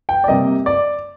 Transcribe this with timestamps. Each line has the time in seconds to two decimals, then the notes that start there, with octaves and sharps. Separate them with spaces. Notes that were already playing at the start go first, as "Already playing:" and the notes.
0.09 G5
0.24 D5
0.28 C3 G3 A#3 D#5
0.66 D5